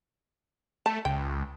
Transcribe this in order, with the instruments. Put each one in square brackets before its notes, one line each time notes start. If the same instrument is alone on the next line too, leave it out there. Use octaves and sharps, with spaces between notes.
[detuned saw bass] A3 [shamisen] A5
[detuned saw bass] C#2 [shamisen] G5